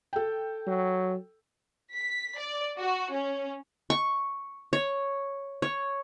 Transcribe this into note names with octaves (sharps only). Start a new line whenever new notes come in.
A4 G5
F#3
B6
D5
F#4
C#4
C#6
C#5
C#5